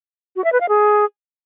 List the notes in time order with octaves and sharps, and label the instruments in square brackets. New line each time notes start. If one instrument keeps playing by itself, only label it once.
[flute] F#4
E5
B4
F5
G#4